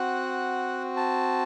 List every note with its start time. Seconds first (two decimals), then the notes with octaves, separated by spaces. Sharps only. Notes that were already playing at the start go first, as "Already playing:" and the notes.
Already playing: C4 F#4 F#5
0.97 A5